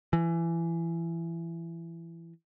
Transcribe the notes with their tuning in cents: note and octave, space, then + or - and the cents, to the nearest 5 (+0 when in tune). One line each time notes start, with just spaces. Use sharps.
E3 +20